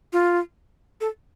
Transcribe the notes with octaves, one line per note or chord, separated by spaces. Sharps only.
F4
A4